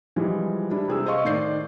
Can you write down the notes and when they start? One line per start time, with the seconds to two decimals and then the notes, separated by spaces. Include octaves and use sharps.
0.16 E3 F3 G3 G#3
0.71 G3 D4 E4
0.88 C3 G#4 E6
1.06 C5 D#5 F5 C6 C#6
1.25 A2 D#3 D5 G6 C7